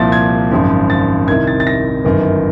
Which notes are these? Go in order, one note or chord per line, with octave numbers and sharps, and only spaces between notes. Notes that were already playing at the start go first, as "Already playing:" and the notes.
Already playing: C2 A#2 F3 A6
G#6
G#1 F#2 C#3 F3
A6
C2 C3 D#3 G#6
A6
A6
A#6
G1 F#2 D#3